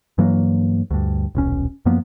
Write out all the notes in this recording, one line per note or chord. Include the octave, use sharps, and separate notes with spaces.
G2 E3 F#3 A#3
D2 G2
D#1 B1 C#4
F#2 F3 A#3 B3